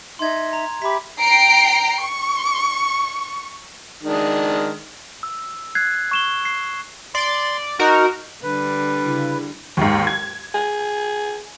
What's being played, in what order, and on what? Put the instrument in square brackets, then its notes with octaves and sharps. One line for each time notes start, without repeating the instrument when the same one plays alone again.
[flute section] D#4 E5 [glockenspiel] C6 G#6
[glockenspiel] A#5
[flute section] G4 E5 B5 [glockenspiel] D6 B6
[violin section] G5 A#5 C7 D7
C#6
[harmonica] D#3 G#3 D4
[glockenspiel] E6
F#6 G#6 C7
C#6 E7 G7
C7
[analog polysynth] D5 [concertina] C6
[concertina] D#4 [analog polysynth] F#4 A#4
[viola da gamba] D3 G3 [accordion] B4
[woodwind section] C#3 E4
[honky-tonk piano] D#2 G#2
G#6
[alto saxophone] G#4